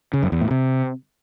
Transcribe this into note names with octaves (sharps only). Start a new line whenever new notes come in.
C#3
F#2
E2
A2
C3